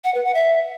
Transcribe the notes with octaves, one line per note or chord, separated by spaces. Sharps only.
F#5
B4
F#5
E5